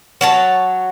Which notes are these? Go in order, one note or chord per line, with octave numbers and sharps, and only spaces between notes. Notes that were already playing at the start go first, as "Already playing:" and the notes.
F#3 C#5 A5